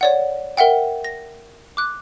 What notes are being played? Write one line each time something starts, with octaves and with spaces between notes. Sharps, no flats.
C#5 D5 F#5
A#4 E5 F#5 G5
A#6
D6 F#6